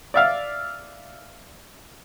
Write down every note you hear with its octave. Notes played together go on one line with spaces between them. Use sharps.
D5 E5 F5